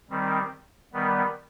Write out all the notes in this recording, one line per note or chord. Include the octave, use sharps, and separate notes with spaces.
D#3 G3 C4
D#3 G3 B3